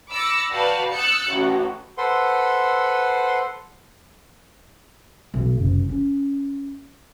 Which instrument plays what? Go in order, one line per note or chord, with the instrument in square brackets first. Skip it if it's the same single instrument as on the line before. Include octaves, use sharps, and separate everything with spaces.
[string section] B5 D6 E6 A6 A#6 C#7
F#4 B4 D5 F5 G5 A5
D#6 E6 F#6 G6 A6 C#7
A1 F#4
[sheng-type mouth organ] A4 B4 C5 F#5 C6
[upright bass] B1
F#1 C2
C#4